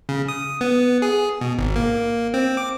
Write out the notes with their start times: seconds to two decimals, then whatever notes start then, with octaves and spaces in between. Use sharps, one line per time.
0.09 C#3
0.28 D#6
0.61 B3
1.02 G#4
1.41 B2
1.59 G#1
1.76 A#3
2.34 C4
2.57 D6